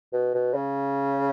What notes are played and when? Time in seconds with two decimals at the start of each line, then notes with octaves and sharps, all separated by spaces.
0.13 B2
0.34 B2
0.54 C#3